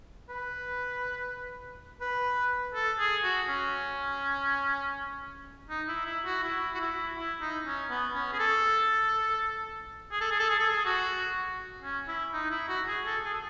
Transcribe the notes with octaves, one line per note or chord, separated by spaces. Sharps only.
B4
B4
A4
G#4
F#4
C#4
D#4
E4
E4
F#4
E4
F#4
E4
E4
D#4
C#4
B3
C#4
G#4
A4
G#4
A4
G#4
A4
G#4
A4
G#4
F#4
C#4
E4
D#4
E4
F#4
G#4
A4
G#4
A4